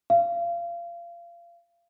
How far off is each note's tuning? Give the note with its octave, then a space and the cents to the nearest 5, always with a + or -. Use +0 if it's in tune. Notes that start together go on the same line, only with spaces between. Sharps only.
F5 -30